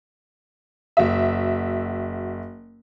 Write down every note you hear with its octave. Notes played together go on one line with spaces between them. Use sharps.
F#1 F#4 E5